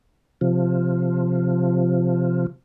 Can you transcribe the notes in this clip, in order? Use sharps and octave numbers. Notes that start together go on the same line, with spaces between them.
C3 F3